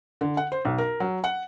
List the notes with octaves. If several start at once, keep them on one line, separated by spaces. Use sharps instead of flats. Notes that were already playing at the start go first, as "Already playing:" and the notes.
D3
F#5
C5
B1
A#4
F#3
F#5